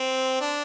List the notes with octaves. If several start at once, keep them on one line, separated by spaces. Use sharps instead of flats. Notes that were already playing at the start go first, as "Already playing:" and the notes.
Already playing: C4
D4